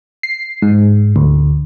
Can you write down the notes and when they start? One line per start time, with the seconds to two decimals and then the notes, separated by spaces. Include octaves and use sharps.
0.23 C7
0.62 G#2
1.16 D2